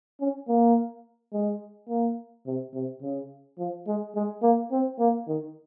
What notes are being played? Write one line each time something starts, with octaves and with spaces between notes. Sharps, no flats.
C#4
A#3
G#3
A#3
C3
C3
C#3
F3
G#3
G#3
A#3
C4
A#3
D#3